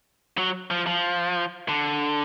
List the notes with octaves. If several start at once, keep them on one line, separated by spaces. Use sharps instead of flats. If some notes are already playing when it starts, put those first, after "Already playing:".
F#3
F3
F3
D3